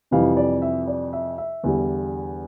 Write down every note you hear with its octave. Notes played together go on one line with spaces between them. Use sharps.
F2 C3 E3 G3 F5
D5
E5
D5
E5
E5
E2 D3 G3